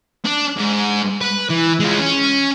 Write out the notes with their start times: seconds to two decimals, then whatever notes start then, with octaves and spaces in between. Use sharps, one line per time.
0.25 D4
0.57 G#2
1.21 B4
1.50 E3
1.80 G#3 F4
1.99 C#4